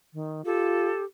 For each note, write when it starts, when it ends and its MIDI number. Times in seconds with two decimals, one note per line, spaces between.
0.14 0.44 51
0.45 0.92 65
0.45 1.04 67
0.45 1.01 69